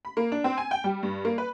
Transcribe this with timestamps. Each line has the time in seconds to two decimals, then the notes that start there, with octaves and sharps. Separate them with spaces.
0.05 B5
0.17 A#3
0.32 D4
0.44 C4
0.58 G#5
0.71 G5
0.84 G3
1.03 G2
1.25 A#3
1.38 B4